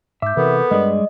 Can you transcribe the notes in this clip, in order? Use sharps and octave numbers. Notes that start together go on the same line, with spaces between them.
G#2 E5 D6 G6
C3 E3 B3 A4 A#4
G2 G3 G#3 D5 D#5